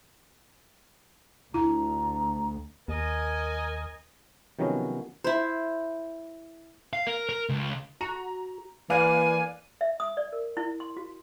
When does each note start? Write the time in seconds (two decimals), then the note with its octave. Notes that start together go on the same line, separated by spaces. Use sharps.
1.54 D2 E4 A#5
2.88 D#2 A#4 D#5 G#5
4.59 C3 D#3 F3 F#3 B3 C#4
5.24 E4 C5
6.93 F5
7.07 A#4
7.29 A#4
7.49 C#2
8.01 F#4 A#5
8.90 E3 A#3 D5 F5 G#5 F#6
9.81 E5
10.00 D#6
10.17 D5
10.32 A#4
10.57 E4
10.80 C6
10.97 F#4